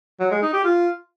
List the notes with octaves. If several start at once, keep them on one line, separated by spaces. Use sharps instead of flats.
F#3
G#3
D#4
G4
F4